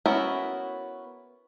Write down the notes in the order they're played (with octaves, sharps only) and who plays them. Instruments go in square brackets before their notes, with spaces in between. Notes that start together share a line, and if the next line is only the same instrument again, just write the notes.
[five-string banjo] B3 C#4 E4 F#4 A#4